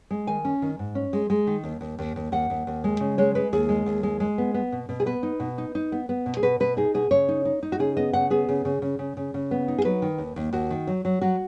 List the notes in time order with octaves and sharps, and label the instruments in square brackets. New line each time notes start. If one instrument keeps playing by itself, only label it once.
[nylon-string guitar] G#3
D#3 G#5
C#4
D#3
G#2
C#4
G#3
G#3
D#3
D#2
D#2
D#2
D#2
D#2 F#5
D#2
D#2
G#3
C#3
G#3 C#5
G#3 B4
D#2 G#4
G#3
D#2
G#3
G#3
B3
B3
B2
B2
G#4
B3 B4
D#4
B2
D#4
D#4
B3
B3
B2
G#4
B2 B4
B2 B4
D#4 G#4
B2 G#4
C#3 C#5
D#4
D#4
D#4
F#4
C#3 G#4
B3 D#5
C#3 F#5
B3 G#4
C#3
C#3
C#3
C#3
C#3
C#3
B3
D#4
G#4
F#3 B4
D#3
D#2
D#2
D#2 F#4
D#3
F#3
F#3
F#3 F#4